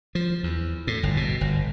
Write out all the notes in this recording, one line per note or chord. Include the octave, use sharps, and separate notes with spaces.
F3
E2
A2
G1
B2
G1